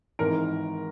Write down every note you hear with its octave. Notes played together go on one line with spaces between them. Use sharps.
G#1 G#2 E3 A#4